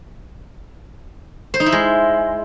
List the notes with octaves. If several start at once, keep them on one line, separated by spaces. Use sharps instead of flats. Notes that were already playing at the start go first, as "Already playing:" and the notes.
C5
D#4
E4
G#3